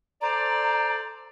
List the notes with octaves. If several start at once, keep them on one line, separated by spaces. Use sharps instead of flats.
A4 C5 D5 A#5